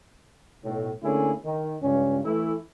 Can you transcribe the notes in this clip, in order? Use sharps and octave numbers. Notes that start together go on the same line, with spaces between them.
B1 A2
D3 A3 A#3 C#4 E4 G#4
D#3
C#2 G2 C#4
E3 A3 E4